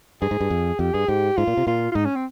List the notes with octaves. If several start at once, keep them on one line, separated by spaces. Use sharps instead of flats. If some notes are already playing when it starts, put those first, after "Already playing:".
G2 G#4
G#2
G2
F2
F2 G4
G2 G#4
G#2 G4
G#2 F4
A#2
C3
A#2 F4
F4
G#2 D#4
C#4
C4